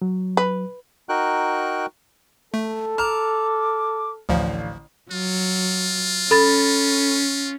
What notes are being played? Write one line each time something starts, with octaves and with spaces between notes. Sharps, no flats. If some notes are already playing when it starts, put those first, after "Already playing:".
F#3
B4
D#4 F#4 A#4 G5 F#6
A3 A4
A5 A#5 D6 F6
A1 D2 D3 F3 F5
F#3 F4
C#4 A4 B5 A6